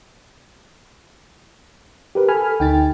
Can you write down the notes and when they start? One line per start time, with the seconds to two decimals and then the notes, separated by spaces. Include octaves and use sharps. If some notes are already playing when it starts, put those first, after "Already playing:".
2.15 G4 A#4 B4
2.29 A4 G#5 B5 F6
2.60 D2 D#4 G5 A6